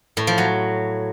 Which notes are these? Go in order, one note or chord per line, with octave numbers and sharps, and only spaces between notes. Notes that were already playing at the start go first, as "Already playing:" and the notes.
A2
F3
F#3